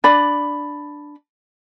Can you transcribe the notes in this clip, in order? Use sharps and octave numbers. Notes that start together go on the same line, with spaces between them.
D4 D5 B5